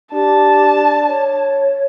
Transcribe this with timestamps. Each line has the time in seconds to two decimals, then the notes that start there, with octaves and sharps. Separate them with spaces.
0.13 D4 G4 A5
1.07 C#5